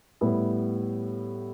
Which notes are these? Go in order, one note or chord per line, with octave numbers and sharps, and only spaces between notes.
A2 G3 B3 E4